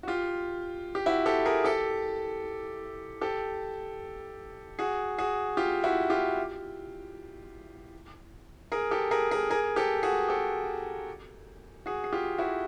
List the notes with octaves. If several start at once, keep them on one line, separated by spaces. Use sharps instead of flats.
F#4
F4 G4
G4
E4 F#4
G4 A4
G#4 A#4
G4 A4
G4 A4
F#4 G#4
F#4 G#4
F4 G4
E4 F#4
F4 G4
G#4 A#4
G4 A4
G#4 A#4
G#4 A#4
G#4 A#4
G4 A4
F#4 G#4
G4 A4
F#4 G#4
G#4
F4 G4
E4 F#4